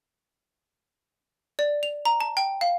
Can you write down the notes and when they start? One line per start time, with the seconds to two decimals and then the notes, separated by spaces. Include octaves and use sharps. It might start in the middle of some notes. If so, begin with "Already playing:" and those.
1.59 D5
1.83 F7
2.05 A#5
2.21 A5
2.37 G5
2.61 F5